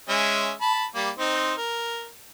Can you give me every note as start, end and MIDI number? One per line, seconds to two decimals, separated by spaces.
0.09 0.52 56
0.09 0.52 61
0.09 0.52 76
0.61 0.85 81
0.61 0.85 83
0.95 1.10 55
0.95 1.10 58
1.19 1.54 60
1.19 1.54 63
1.19 1.54 72
1.57 2.08 70